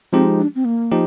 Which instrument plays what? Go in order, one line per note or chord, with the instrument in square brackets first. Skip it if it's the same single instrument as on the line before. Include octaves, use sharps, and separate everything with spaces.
[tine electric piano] F3 G#3 D#4 G4 [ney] C4
[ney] D4
C4
A#3
[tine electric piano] F3 D#4 G4